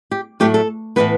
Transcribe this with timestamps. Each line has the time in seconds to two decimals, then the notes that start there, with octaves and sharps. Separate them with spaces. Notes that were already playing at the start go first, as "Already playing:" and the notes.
0.11 G4
0.40 A2 F#3 A3 G4
0.54 A4
0.96 A2 E3 B3 B4